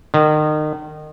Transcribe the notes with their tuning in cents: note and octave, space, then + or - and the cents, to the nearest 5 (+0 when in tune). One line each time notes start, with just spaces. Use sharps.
D#3 -30